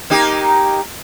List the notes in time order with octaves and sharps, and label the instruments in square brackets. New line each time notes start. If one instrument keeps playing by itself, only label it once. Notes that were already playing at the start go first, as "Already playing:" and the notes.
[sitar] A#3 D#4 G4